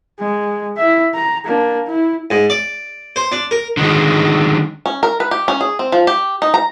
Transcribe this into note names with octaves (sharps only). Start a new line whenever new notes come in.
G#3
E4 E5
A#5
A#3 D4
E4
G#2
D5
C5
D4
A#4
D3 D#3 G#3
C#4
A#4
B4
G4
C#4
G#4
C4
F3
G4
D#4
A#5